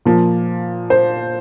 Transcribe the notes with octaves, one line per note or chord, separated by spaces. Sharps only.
A#2 F3
C5